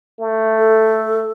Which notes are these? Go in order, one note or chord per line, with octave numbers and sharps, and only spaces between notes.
A3
A4